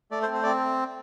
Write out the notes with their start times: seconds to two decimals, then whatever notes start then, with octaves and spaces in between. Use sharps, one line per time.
0.11 A3 D5
0.22 C5
0.27 C4
0.34 C5
0.43 C4 D5